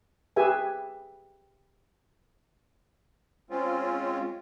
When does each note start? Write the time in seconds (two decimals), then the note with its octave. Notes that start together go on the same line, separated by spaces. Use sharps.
0.36 G4 G#4 B4 E5 G#5
3.50 G#3 C4 C#4 F4